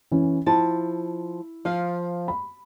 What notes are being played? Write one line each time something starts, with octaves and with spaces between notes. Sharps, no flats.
E3 C#4
F3 E4 A5
F3 F5
B5